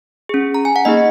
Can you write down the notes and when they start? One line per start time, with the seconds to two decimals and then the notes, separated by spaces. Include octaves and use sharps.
0.29 C#4 G#4
0.55 A#5
0.65 G#5
0.76 F#5
0.85 A#3 D#4 G#4 D#5